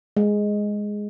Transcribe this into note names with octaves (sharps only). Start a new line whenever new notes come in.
G#3